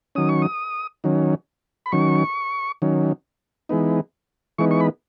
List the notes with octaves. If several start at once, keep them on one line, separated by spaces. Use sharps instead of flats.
D#3 F#3 C#4 D#6
C#6
D#6
D#3 F#3 C#4
B5
D#3 F#3 C#4 C#6
D#3 F#3 C#4
E3 G#3 B3 D#4
E3 G#3 B3 D#4 C#6
C#6
B5